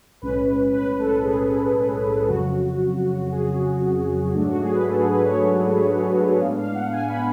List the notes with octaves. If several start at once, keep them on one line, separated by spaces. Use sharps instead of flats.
B1 A2 G#3 C#4 B4
B4
A4
G#4
F2 C#3 F#3 F#4
G#4
G#2 F#3 A3 D4
F#4
G#4
B4
A4
G#4
B4
C#5
A2 G#3 B3 D4 F5
F5
F#5
G#5
B5